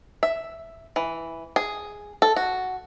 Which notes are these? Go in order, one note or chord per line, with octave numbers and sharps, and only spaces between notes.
E5
E3
G#4
A4
F#4